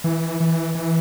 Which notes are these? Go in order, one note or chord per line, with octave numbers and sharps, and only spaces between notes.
E3
E3
E3